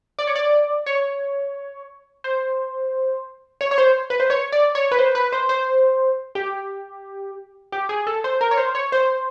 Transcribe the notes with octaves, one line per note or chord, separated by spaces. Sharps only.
D5
C#5
D5
C#5
C5
C#5
C#5
C5
B4
C5
C#5
D5
C#5
B4
C5
B4
C5
C5
G4
G4
G#4
A4
C5
A#4
C#5
C5
C#5
C5